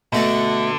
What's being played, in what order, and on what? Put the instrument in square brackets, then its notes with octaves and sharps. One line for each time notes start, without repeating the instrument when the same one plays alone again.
[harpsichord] B2 A3 F#4 A4 [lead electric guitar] D3